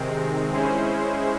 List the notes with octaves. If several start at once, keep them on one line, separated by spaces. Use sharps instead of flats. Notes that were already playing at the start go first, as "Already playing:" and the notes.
Already playing: C3 D#3 G#3 C4
G#3 C#4 E4 G#4 C5